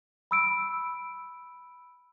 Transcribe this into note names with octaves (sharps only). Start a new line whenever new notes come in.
B5 E6 D7